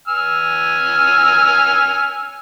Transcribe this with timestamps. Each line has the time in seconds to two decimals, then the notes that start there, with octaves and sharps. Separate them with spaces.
0.08 G#5 E6 F6